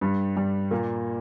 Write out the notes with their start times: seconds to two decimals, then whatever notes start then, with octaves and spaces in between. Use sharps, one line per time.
0.01 G2 G3
0.36 G2 G3
0.71 A#2 A#3